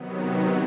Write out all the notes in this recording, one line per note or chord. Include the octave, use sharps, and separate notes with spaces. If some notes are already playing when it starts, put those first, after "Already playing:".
Already playing: C3 D#3 F#3 B3